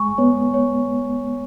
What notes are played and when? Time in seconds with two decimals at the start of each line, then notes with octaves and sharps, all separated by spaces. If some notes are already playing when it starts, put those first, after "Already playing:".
Already playing: G#3 G#5 C#6
0.18 B3 C#5
0.54 C#5